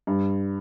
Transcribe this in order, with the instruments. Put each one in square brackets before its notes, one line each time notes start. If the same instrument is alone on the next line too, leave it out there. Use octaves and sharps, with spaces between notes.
[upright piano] G2